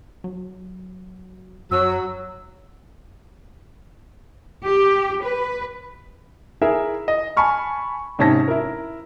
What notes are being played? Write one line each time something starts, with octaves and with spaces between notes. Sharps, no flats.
F#3
F#2 F#3 E6
G4
B4
E4 G#4 A#4 E5
D#5
G#5 A5 B5 C#6 F6
G#2 C3 C#4 A5 A#6
E4 A#4